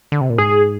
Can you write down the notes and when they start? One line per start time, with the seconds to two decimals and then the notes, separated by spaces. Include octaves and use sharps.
0.12 D3
0.21 C3
0.30 A#2
0.38 G#2 G#4